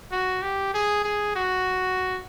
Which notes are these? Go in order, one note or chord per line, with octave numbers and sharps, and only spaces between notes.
F#4
G4
G#4
G#4
F#4